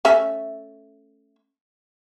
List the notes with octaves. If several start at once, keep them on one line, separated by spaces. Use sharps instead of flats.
A3 C#4 E5